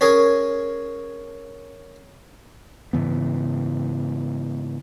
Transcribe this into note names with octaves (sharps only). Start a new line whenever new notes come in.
C#4 G#4 A#4 C#5
G#2 C#3 E3 B3